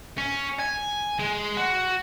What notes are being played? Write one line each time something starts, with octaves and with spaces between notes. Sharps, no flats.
C#4
G#5
G#3
F#4